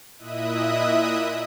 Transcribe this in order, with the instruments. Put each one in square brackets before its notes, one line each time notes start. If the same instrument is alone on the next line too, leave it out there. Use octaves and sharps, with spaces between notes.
[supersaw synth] A#2 E4 D#5 E5 D#6 F#6